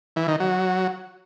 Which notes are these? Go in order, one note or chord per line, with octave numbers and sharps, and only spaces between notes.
E3
D#3
F#3